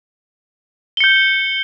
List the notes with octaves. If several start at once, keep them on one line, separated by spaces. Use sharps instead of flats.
G6 C#7 G7